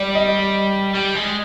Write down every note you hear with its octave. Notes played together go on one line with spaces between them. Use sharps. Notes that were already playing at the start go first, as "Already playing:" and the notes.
Already playing: G3 D5
D#5
G3
G#3